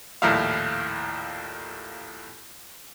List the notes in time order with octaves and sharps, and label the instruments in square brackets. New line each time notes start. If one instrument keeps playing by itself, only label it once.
[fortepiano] A#1 D#2 A2 E4 F5